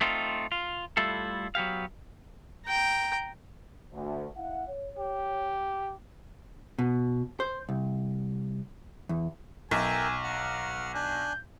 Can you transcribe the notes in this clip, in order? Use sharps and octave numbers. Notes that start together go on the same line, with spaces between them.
A3 C4 D#4 F4
F4
G3 A3 E4 F4 A4
F#3 B3 G4 F5
G5 A#5
D2
E4 F5 F#5
C#5
G4
B2
C5
C2
E2
B1 A#4 E5 G5 G#5
F#5 A#5 F6
D4 G#5 F#6 G6